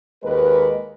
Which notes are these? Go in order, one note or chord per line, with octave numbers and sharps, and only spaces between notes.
D#2 G#3 A#4 B4